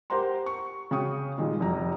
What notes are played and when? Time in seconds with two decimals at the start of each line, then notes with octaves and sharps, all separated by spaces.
0.10 G4 A#4 C5 F#5 A#5 C6
0.46 C#6
0.91 C#3 F#4 G5 C#6 D#6
1.38 A#2 D#3 G3 G#3
1.60 F1 F#2 A#5